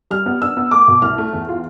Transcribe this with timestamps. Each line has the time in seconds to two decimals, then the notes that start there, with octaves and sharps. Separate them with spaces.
0.10 G3 F6
0.26 B3
0.42 D4 E6
0.57 B3
0.71 A3 D6
0.88 B2
1.02 C2 F6
1.18 A3
1.33 E2
1.49 F4